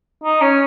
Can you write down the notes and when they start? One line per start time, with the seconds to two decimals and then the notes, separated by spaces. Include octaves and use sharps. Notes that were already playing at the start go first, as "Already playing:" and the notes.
0.24 D#4
0.41 C#4